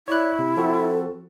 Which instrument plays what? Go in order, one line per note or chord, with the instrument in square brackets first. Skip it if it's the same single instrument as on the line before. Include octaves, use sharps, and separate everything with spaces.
[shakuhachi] E4 [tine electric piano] C#5 D5 F#6
[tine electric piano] C3
[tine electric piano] F3 C4 F#4 [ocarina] A4